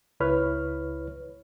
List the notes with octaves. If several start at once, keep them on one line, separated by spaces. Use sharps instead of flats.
C#2 E4 B4 C#5 F6